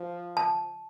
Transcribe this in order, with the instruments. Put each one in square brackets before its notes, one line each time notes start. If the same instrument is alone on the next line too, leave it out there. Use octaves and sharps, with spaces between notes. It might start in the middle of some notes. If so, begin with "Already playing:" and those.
Already playing: [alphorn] F3
[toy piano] A5